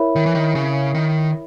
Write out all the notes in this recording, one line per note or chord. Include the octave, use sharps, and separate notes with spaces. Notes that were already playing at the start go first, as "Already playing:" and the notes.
Already playing: E4 A#4 C#5 E5 B5
D#3
E3
D#3
C#3
D#3